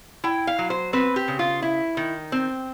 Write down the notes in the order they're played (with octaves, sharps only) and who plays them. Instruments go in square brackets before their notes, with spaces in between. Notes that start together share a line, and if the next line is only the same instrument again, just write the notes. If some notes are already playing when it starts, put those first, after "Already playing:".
[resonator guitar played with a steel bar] E4 G5
F5
F#3
C5
C4 B4
G4
C#3
F4
E4
D#3
C4